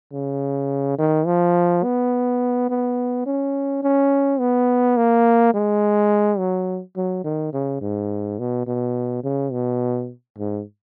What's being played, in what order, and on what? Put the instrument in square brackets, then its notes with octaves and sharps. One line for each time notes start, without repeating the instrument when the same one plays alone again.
[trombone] C#3
D#3
F3
B3
B3
C#4
C#4
B3
A#3
G#3
F#3
F#3
D#3
C#3
G#2
B2
B2
C#3
B2
G#2